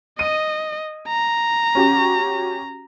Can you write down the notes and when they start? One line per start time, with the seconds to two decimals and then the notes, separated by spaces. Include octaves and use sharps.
0.19 D#5 D#7
1.08 A#5
1.75 C#4 F#4 G4